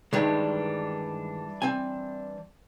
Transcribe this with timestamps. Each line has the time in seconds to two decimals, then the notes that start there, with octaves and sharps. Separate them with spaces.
0.13 G2 D#3 E3 G3 G#3 D4
1.62 C4 G#5